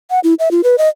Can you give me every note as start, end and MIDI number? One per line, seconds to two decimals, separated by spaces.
0.10 0.20 78
0.24 0.34 64
0.39 0.51 76
0.51 0.61 65
0.64 0.76 71
0.78 0.89 75